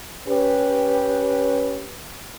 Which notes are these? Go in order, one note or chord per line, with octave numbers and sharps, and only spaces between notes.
C#4 G4 B4